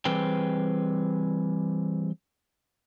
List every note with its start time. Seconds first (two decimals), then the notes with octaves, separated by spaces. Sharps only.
0.05 E3 G3 C4 G#4 B4 G5